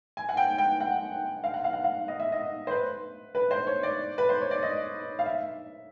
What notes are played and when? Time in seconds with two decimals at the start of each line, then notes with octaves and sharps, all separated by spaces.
0.17 G#5
0.29 F#5
0.37 G5
0.58 G5
0.80 F#5
1.44 F5
1.54 F#5
1.64 F5
1.73 F#5
1.84 F5
2.08 D#5
2.20 E5
2.32 D#5
2.67 C5
2.71 B4
3.35 B4
3.51 C5
3.67 C#5
3.83 D5
4.18 B4
4.29 C5
4.41 C#5
4.51 D5
4.63 D#5
5.19 F5
5.26 E5